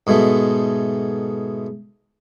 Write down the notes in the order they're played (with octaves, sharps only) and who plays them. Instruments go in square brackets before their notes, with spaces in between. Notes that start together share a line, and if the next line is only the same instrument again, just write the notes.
[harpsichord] G#2 B2 G#3 A3